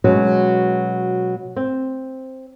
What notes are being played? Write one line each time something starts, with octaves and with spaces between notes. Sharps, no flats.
B2 F#3 G#3 C#4
C4